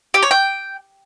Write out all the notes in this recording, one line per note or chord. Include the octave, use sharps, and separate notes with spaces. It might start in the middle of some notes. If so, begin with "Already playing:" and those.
G4
C#5
G5